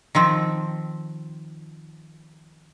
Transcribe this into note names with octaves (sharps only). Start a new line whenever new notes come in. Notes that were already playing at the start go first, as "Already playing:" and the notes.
D#3 F3 C4